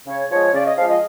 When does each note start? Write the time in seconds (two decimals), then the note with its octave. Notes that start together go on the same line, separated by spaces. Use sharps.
0.07 C#3 C#5
0.31 F3 G#3 C#5
0.53 C#3 D5
0.66 D#5
0.77 F3 G#3 F5
0.89 D#5